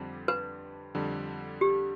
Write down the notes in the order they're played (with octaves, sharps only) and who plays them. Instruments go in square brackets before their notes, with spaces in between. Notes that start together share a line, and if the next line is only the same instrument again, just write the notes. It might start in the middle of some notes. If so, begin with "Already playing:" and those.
Already playing: [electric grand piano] F2 D3 G3 C4
[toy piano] B4
[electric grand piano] F2 D3 G3
[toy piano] G4